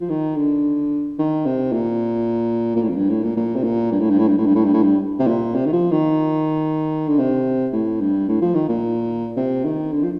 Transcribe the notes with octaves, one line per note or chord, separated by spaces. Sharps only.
F3
D#3
D3
D#3
C3
A#2
A#2
A2
F2
G2
A2
A#2
A#2
C3
A#2
G2
A2
G2
A2
G2
A2
G2
A2
G2
A2
G2
C3
A#2
C3
D#3
F3
D#3
D3
C3
A2
G2
A2
F3
D#3
A#2
C3
D#3
D3
F3